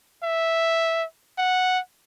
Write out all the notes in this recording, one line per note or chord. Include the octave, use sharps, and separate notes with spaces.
E5
F#5